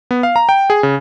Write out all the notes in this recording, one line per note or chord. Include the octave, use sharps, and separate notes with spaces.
B3
F5
A#5
G5
G#4
C#3